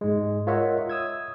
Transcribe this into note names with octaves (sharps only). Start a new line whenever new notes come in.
G#2 G#3
F4 A#4 C#5 D#5 E5 F#5
D#6 E6 G#6